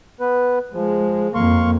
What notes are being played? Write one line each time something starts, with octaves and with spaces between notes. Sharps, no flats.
B3 B4
F3 G#3
F2 A#3 F5 C6 C#6